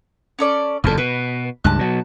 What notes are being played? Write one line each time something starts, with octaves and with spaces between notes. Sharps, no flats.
C#4 A4 D5
F#1 E2 A#2 A4 F6
B2 B4
C#2 G2 A5 F#6
B2 F#3